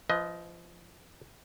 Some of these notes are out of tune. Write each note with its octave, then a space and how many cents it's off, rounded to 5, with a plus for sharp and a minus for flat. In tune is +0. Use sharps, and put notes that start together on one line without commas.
F3 -20 B4 +0 D#5 +15